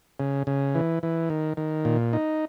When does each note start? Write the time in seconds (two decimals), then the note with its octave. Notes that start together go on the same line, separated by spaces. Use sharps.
0.20 C#3
0.47 C#3
0.75 E3
1.03 E3
1.30 D#3
1.57 D#3
1.85 A#2
2.13 D#4